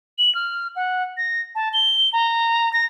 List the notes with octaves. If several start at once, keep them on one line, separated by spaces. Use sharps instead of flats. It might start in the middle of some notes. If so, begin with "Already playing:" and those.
F#7
F6
F#5
A#6
A5
G7
A#5
A#6